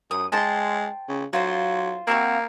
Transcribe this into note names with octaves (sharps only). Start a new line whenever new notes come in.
F#2 D#6
G#3 C5 G5 A5
C#3
F#3 F4 C5
A#3 C4 F#4 F5